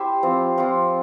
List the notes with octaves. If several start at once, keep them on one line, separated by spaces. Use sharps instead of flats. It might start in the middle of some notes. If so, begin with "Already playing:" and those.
Already playing: E4 G4 C5 E5
F3 C4 F4
F3 C4 F4